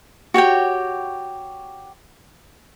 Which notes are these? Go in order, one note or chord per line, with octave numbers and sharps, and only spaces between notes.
F#4 G4 C#5 G5